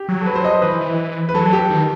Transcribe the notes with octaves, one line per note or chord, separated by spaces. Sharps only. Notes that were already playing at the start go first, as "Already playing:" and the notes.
Already playing: G4
F#3
A4
B4
C5
D#5
C5
E3 B4
E3
B4
F#3 A4
A4
G4
D#3